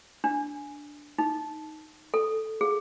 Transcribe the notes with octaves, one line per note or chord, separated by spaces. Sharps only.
D4
D#4
A4
G#4